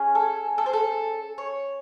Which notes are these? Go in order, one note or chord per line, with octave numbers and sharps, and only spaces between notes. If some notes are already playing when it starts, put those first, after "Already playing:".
Already playing: C#4 G#4
A4
A4
C5
A4
C#5